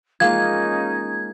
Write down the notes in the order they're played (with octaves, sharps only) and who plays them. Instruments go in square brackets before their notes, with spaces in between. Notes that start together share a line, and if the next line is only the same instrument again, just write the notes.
[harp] G#3 A#3 F4 [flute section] C#4 D#4 [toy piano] F5 D#6 [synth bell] G#6